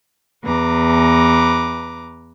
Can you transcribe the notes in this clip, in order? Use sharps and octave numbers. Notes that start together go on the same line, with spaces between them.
E2 B4 A#5 D6